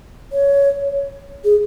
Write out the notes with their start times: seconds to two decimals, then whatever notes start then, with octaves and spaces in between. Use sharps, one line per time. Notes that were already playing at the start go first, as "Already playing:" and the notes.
0.32 C#5
1.44 G#4